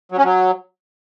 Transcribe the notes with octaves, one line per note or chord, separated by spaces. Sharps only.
F#3
C#4
F#3